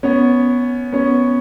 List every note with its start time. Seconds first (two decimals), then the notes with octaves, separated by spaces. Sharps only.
0.03 B3 C#4
0.92 B3 C#4